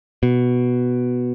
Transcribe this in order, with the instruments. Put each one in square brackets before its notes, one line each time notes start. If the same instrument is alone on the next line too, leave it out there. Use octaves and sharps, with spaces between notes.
[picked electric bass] B2